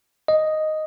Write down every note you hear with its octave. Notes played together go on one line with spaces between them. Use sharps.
D#5